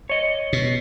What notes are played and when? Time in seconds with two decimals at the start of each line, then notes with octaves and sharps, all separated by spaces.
0.09 C#5 D#5
0.53 B2